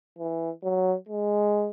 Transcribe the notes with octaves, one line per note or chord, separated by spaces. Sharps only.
E3
F#3
G#3